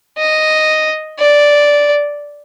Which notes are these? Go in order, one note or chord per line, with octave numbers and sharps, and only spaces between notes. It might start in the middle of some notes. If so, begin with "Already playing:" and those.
D#5
D5